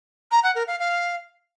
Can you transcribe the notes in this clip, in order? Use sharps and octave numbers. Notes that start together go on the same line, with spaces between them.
A#5
F#5
A#4
F5
F5